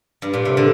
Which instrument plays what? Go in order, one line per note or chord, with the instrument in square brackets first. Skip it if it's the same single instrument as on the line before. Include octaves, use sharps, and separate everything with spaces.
[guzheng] G2
A#2
C3
D3